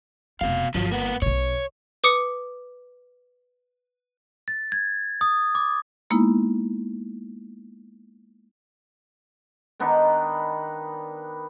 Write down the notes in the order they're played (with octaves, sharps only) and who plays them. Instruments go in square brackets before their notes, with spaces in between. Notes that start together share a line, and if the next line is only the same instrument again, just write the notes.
[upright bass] F1 C4 [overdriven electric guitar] B2 F5
[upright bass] G1 [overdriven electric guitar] F3 F#3
[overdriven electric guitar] A#3 B3
[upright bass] B1 B2 [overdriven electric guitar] C#5
[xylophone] B4 D6 D#6 C#7
[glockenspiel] A6
G#6
D#6
D6
[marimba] G#3 A#3 B3 D#4 E4
[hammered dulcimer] D#3 B3 D4 D#4